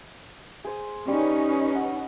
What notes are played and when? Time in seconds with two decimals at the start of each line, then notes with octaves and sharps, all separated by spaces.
0.64 G#4 C5 D#6
1.08 G3 C#4 D#4 B4
1.75 F#5 E6